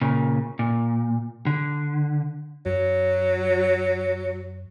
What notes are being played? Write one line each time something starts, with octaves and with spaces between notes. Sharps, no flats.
A#2 C#3
A#2
D3
F#2 F#3